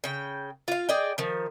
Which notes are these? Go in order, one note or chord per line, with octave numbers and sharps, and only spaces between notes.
C#3 G5
F4 F5
G#4 D5 D#5 G5
D#3 F3